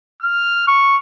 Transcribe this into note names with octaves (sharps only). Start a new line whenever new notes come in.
F6
C#6